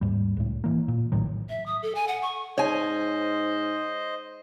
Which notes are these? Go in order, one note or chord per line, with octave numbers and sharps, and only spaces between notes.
D#2 G#2 G3
C#2 A2
E3 A#3
A#2
A#1 A2 D#3 F#3
E5
D#6
A4
G#5
F#5
C#6
G#2 C5 C#5 D#5 G#5